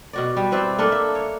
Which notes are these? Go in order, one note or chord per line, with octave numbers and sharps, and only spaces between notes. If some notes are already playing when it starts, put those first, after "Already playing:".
B2 F#4 D5
G3
C4 B4 D5 E5
A#3 D4 A4 B4
E5
C#5